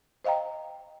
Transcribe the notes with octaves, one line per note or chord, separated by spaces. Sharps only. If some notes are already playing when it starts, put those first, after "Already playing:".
C5 D#5 F5 G5 A#5